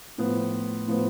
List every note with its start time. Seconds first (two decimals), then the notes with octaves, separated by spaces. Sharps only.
0.18 A2 F3 B3
0.88 A2 F3 B3